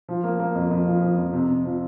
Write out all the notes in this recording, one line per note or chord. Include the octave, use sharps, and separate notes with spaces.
F3
A#3
A#3
F2
F2
F3
F3
F2
C3
C3
F3